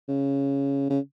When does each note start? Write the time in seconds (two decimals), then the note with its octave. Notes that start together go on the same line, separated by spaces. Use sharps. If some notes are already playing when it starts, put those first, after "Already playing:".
0.08 C#3
0.90 C#3